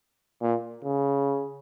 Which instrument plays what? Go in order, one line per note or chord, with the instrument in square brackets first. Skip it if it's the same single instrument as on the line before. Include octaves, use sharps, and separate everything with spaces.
[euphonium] A#2
C#3